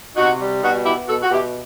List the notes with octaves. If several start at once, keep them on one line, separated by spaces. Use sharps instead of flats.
C3 D#4 F#4
G3
B2 D#4 F#4
B3 E4 G4
B2 F#4 A4
F#4
B2 E4 G4